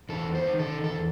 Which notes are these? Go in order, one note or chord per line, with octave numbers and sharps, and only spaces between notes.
E2 A4
C5
D#3
A4
E2 A4